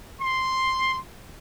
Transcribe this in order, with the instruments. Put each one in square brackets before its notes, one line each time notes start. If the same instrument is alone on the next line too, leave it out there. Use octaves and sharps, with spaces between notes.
[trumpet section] C6